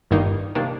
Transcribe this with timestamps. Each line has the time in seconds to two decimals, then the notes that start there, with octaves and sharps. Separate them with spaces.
0.11 G1 G2 D#3 A#3 D#4
0.55 C3 D#3 A#3 D4